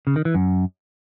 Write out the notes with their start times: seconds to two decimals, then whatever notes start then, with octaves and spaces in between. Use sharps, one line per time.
0.07 C#3
0.16 D#3
0.25 E3
0.35 F#2